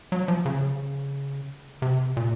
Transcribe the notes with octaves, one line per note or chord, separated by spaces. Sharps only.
F#3
F3
C#3
C3
A#2